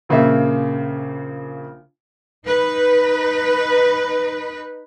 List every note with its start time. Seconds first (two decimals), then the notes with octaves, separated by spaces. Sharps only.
0.09 A#1 C#3 A#3 E5
2.45 D#4 B4